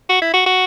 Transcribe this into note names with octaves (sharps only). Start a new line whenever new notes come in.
F#4
E4
F#4
F#4